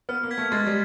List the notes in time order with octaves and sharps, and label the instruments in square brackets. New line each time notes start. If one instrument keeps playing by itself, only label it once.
[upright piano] B3 [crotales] F6
[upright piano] A#3
[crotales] G#6 B6
[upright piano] A3
[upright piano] G#3 [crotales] A6
[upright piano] G3